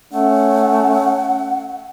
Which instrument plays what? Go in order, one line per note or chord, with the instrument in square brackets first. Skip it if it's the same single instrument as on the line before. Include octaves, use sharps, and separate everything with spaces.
[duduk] A3 [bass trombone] C#4 [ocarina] F#5